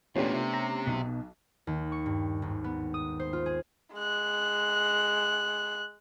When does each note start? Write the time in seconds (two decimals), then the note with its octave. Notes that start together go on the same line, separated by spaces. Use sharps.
0.16 E2 A#2 A3 B3 C#4 D4 F4 G4
0.34 C3
0.54 A#5
0.87 B1 B2
1.67 D#2
1.92 C#6
2.06 G2
2.42 G#1
2.64 B3
2.94 D#6
3.20 C5
3.33 F4
3.46 G#4
3.94 G#3 F#6